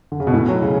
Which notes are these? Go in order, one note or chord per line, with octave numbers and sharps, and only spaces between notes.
D3
C#3
B2
A2
F#3
C#3